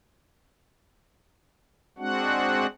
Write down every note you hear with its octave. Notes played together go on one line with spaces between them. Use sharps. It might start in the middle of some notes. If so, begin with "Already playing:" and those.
G#3 C4 D4 F#4 F#5